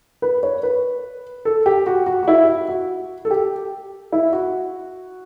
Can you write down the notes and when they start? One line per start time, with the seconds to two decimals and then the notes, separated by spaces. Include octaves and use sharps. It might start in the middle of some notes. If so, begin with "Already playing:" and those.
0.22 B4
0.43 C#5
0.63 B4
1.45 A4
1.66 G4
1.87 F#4
2.06 F#4
2.23 F#4
2.28 E4
2.43 G4
2.48 F#4
2.69 F#4
3.25 A4
3.31 G4
4.12 E4
4.33 F#4